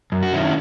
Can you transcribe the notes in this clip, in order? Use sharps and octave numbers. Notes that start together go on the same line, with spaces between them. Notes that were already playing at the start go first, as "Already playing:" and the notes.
F#2
F#4
D#3 C#4 E4